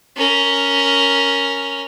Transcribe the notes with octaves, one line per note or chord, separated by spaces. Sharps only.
C#4 A#4